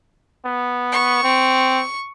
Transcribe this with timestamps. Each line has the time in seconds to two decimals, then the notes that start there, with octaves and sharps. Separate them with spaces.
0.45 B3
0.92 C#6
1.23 C4